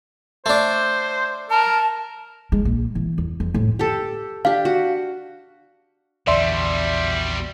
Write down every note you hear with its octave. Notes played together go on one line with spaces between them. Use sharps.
A3 D4 C5
A#4 A5
G#3
A#1
E3
E2
F2
A2
G4 A4
D4 G4 F5
F#4
A#1 E2 B2 D3 G3 D5 E5 C6